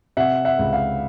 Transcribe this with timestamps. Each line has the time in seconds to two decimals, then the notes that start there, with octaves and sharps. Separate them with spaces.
0.17 C3 E5 F#5
0.45 E5 F#5
0.59 C#2
0.73 F5